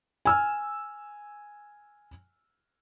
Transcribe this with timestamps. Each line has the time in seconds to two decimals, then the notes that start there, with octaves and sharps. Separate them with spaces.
0.25 G#5 E6 F6